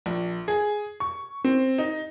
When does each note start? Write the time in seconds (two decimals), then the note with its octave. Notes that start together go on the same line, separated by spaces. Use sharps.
0.06 A#1
0.48 G#4
1.00 C#6
1.45 C4
1.78 D#4